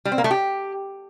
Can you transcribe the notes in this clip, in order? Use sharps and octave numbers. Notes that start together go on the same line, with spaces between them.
G3
C4
A#3
A3
G4